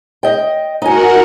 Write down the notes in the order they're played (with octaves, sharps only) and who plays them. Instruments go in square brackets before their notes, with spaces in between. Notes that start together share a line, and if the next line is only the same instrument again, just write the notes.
[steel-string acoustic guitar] D#5 G5
[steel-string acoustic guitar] D#4 G#5 [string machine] F#4 A#4 F#5